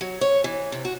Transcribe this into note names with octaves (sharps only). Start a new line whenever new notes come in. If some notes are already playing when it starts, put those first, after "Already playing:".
F#3
C#5
E3
C3
F#4